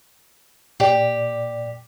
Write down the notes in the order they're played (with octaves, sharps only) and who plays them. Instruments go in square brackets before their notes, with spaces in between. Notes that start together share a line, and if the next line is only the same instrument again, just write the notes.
[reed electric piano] A#2 D5 [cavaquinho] G4